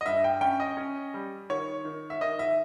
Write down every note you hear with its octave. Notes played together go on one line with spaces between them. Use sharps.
D#5
G2 E5
G5
C#4 G5
D#5
C#4
G3
D#3 C#5
D#3
E5
D#3 D#5
E5